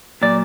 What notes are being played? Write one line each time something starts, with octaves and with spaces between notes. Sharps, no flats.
A#2 F#3 D5